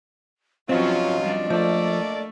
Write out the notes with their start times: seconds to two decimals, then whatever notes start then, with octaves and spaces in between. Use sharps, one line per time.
0.69 G2 C3 F3 F#3 C4 C#4 F4 D#5
1.21 F3 G3 D4
1.50 F3 A3 A#3 A4 D5